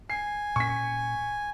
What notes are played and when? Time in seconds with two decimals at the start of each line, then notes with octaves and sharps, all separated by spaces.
0.10 G#5 C7
0.56 A#2 C#4 C#6 B6